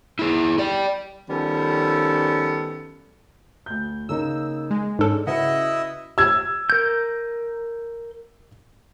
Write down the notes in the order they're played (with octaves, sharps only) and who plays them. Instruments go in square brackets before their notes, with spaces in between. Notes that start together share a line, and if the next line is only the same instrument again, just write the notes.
[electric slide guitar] E4 G#4
G4 D5
[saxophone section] D#3 F3 G3 B3 C#4 A4
[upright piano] D2 G6
[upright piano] C#3 A#3 D#4 [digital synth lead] E6
[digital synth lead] G#3
[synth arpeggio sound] G#2 A4 [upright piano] C#4 D4
[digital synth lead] C#3 [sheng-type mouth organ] E4 D#5 E5 [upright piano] F#4 B4 F#5
[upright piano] E6 G#6
[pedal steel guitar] A#4 G6